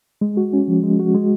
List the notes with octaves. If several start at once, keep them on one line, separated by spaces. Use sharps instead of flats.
G#3
F#4
C#4
F3
G#3
F#4
G#3